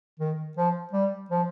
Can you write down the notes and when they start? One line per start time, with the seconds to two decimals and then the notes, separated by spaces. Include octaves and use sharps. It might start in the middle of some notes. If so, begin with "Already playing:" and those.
0.20 D#3
0.57 F3
0.93 G3
1.30 F3